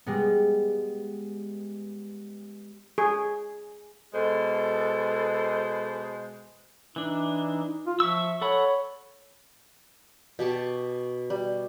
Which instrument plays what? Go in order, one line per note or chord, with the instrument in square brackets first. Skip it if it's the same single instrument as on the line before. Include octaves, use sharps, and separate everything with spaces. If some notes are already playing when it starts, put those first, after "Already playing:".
[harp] G3 G#3 B3
[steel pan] G#4
[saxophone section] B2 G#3 C5 [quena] A4
[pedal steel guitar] E3 D4 [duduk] D#4
[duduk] F4
[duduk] F3 [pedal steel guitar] E5 C#6 E6
[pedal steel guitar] A4 F#5 B5 [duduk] C#5
[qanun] B2 G4 A5 C#6
G3